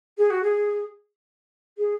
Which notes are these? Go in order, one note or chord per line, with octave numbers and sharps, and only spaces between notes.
G#4
F#4
G#4
G#4